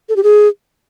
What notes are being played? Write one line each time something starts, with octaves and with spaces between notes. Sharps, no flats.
A4
G4
G#4